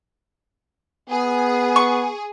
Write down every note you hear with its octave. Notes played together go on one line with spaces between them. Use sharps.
B3 G#4
C#6